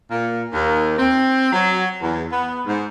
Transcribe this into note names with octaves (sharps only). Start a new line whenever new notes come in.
A#2
D#2
C4
F#3
E2
B3
G#2